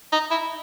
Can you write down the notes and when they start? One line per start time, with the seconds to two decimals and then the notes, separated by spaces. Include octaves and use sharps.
0.12 D#4
0.31 E4